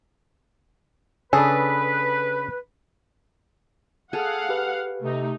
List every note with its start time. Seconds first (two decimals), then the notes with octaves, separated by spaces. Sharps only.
1.33 C#3 D4 G#4 A4 B4
4.13 G#4 A4 F5 F#5
4.49 G4 B4
5.02 C3 A3 D#4